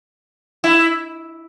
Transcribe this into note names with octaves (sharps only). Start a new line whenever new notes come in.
E4